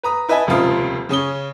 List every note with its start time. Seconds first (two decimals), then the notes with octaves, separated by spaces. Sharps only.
0.03 B4 A#5 D#6
0.29 E4 B4 D#5 E5 G#5 A5
0.47 D#1 C#2 C3 F3 F4 D#6
1.09 C#3 C#4 D#6 G7